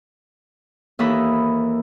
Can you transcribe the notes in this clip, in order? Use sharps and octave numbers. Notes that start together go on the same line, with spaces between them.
D#2 E3 A#3 A4 D#5 B5